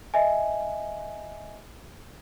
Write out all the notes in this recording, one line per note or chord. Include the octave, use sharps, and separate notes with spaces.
D#5 E5 G#5